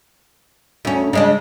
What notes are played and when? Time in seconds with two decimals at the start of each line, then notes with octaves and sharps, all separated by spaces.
0.85 D2 C#4
1.13 C#3 G#3 D4